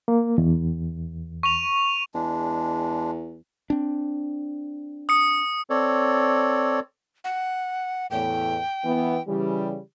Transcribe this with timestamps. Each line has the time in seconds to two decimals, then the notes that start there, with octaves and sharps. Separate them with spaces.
0.08 A#3
0.38 E2
1.43 C#6 D#7 F7
2.14 E2 G#3 D4
3.70 C4 D4
5.09 D#6 C#7
5.70 C4 A4 C#5 D5
7.24 F#5
8.11 E2 A2 G5
8.84 E3 B3
9.28 C#3 E3 G3